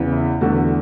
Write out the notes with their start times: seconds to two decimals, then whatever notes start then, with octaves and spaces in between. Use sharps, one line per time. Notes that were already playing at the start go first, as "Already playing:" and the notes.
Already playing: E2 C#3 E3
0.12 E4
0.41 E2 D3 A3 F#4